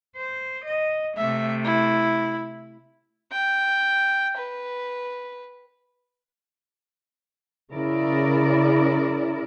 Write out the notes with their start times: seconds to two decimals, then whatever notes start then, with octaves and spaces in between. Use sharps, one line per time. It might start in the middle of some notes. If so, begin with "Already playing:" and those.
0.16 C5
0.65 D#5
1.17 C3 A3 E5
1.65 E4
3.32 G5
4.37 B4
7.71 C#3 E4 A#4 D5